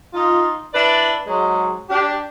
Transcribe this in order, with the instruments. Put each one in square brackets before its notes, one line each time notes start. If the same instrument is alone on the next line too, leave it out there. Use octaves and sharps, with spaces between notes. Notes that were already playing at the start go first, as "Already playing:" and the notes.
[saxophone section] D#4 F4
D4 E4 B4 D5
G#2 F#3 G#3
D4 G4